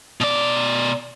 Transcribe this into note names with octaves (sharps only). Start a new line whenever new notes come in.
B2 D5